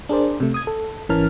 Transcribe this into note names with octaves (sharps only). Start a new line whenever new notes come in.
D4 G#4 A#4 C5 D5
C3 A3
D#6 G#6
A4
G#1 E3 C#4 A#4 A5 F6